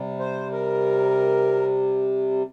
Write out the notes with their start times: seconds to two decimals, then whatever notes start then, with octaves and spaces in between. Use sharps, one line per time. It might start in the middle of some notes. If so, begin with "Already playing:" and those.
Already playing: C3 G3
0.19 C5
0.52 A#4